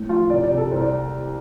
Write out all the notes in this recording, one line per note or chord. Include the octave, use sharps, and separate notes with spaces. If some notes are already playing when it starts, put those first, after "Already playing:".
Already playing: A2
F3 F4
C2 D5
D5
C3
A4
C2 C5
D5